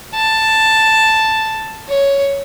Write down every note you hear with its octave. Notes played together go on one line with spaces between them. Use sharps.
A5
C#5